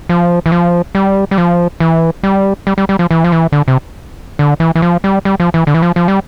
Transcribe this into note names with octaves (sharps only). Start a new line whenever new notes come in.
F3
E3
F3
G3
G3
F3
E3
G3
G3
G3
G3
F3
E3
F3
E3
D3
C3
D3
E3
E3
F3
G3
G3
F3
E3
D3
E3
F3
F3
G3